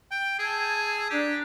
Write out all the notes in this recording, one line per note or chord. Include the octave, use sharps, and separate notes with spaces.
G5
G#4 A5 E6 G#6
D4 G4 A#5